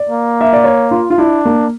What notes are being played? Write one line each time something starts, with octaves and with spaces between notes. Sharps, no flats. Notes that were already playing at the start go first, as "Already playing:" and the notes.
Already playing: D5
A#3
E5
D5
C#5
F4
F4
D4 E4
A#3